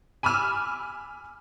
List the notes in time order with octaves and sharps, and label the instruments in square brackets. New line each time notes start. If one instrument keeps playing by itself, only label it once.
[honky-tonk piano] G#5 B5 D6 E6 F6